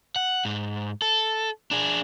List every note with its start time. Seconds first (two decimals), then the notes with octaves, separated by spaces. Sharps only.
0.16 F#5
0.45 G#2
1.02 A4
1.71 D4 G#4